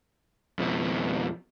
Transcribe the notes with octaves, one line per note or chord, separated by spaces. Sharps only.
F2 B2